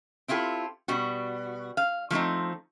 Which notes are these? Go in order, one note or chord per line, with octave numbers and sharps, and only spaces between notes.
C4 E4 F4 G4 A4
B2 G3 F#4
F5
F3 A3 C4 D#4